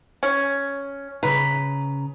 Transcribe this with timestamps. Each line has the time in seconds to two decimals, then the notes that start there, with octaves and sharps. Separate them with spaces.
0.23 C#4
1.23 C#3 B4 A#5